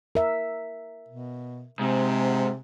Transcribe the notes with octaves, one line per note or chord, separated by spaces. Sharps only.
A#4 E5
B2
G#2 C3